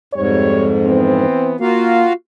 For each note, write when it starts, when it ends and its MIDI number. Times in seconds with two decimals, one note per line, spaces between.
0.14 1.25 41
0.14 1.25 44
0.14 0.70 55
0.14 0.70 67
0.14 0.70 73
0.85 1.54 52
0.85 1.54 59
0.85 1.54 60
1.61 2.05 58
1.61 2.13 65
1.61 2.13 66
1.61 2.13 77